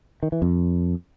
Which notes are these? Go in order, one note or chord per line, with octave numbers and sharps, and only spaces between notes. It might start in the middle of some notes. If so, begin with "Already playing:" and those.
D#3
E3
F2